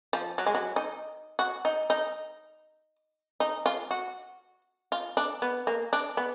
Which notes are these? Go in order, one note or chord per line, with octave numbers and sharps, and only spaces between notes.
F3
F#3
G#3
F#3
D#4
F#4
D#4
D#4
D#4
F4
F#4
F4
D4
B3
A#3
D4
B3